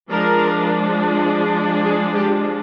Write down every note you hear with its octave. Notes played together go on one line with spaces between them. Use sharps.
F3 G#3 D4 A#4
G#4
G4